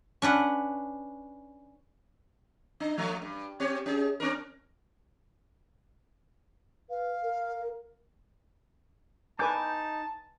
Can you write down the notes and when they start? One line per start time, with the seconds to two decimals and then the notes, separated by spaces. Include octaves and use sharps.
0.22 C#4 D4 B4 F#5
2.80 D4
2.98 F3 A3
3.22 G2
3.60 C4 G4 C#5
3.86 C#4 G#4
4.20 C4 D4 A#4
6.90 B4 F5
7.23 A#4
9.39 D#4 B4 G#5 A5 D6 G6